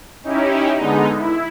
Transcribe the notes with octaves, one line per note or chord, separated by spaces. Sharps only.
C#4 D#4 E4 G4
D3 G#3 B3 D#4
E4